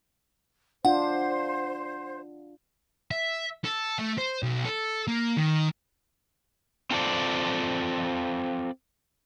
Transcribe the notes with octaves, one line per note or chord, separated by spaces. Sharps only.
D4 F4 C5 F#5
E5
A4
A3
C5
B1
A4
A#3
D#3
C4 F4 A4 C5 D5